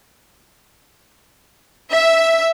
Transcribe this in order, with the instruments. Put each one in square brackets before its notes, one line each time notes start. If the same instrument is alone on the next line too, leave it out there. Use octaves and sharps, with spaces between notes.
[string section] E5